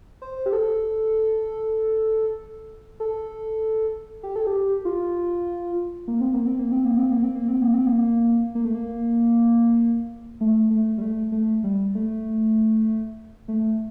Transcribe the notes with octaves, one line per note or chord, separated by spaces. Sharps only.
C5
G4
A4
A4
G4
A4
G4
F4
A#3
C4
A#3
C4
A#3
C4
A#3
C4
A#3
C4
A#3
C4
A#3
C4
A#3
A#3
A3
A#3
A3
A3
G3
A3
A3
G3
A3
A3